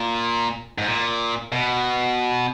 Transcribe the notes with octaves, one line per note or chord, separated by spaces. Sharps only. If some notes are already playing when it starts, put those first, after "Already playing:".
Already playing: A#2
G#2
A#2
B2